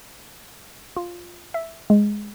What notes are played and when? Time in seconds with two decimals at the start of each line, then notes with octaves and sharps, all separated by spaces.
0.96 F4
1.54 E5
1.90 G#3